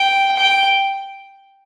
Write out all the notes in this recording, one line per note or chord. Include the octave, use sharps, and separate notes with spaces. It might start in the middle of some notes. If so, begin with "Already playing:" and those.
Already playing: G5
G5